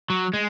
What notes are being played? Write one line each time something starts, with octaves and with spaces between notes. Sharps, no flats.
F#3
G#3